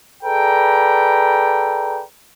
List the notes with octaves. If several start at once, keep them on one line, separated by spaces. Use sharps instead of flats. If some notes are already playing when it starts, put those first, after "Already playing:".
G#4 A4 B4 D5 G5 A#5